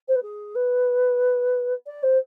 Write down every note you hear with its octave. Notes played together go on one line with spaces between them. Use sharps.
C5
B4
G#4
B4
D5
C5